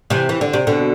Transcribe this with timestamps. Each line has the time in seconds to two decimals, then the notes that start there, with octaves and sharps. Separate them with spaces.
0.10 C3 E3
0.29 E3
0.41 D3
0.53 C3
0.67 B2 D3